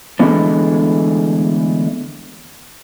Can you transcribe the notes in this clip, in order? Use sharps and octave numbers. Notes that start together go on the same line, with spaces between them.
D3 E3 G#3 A3 B3 D4